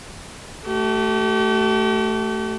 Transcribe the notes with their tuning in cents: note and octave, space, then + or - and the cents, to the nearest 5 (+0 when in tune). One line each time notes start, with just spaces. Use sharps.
A3 +0 G4 -40